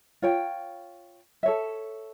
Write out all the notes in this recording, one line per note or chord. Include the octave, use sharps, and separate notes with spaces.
F4 C#5 G5
A4 C#5 E5